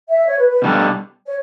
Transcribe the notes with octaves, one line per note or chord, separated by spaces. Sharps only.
E5
C#5
B4
B4
B2 G3 D4 A4
C#5